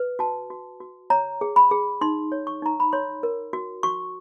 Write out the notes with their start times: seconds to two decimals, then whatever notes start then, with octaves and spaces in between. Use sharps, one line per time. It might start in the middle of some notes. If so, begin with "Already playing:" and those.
Already playing: B4
0.19 F#4 A5
0.50 F#4
0.80 F#4
1.10 C#5 A#5
1.41 G#4
1.56 B5
1.71 G#4
2.01 D#4 C6
2.32 C#5
2.47 C#6
2.62 D#4 A#5
2.80 B5
2.93 C#5 C6
3.23 A#4
3.53 F#4
3.83 F#4 C#6